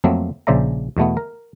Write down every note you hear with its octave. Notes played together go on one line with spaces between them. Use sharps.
F2 F#3 A3 A#3 C4
A#1 C#3 C5 D5 E5 A#5
E2 B2 A3 B3
A#4